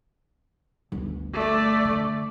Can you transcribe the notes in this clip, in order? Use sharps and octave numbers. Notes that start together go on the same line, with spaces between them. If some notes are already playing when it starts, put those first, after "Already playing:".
G1 D2
A3 D5
D3